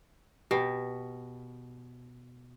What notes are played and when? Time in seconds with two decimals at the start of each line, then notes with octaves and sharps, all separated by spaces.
0.51 B2 G4